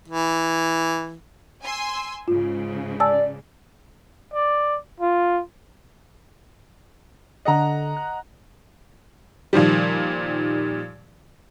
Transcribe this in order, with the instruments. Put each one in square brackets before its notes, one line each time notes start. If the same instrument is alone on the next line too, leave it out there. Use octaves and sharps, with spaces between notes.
[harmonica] E3
[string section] G#5 C6 E6
[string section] G#2 C#3 [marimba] F4
[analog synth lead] D5 [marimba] G#5 A5 E6
[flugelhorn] D5
F4
[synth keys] D3 A4 F#6 [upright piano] D#5 F#5 A#5
[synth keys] F#6
[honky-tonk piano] A#2 D#3 F3 G3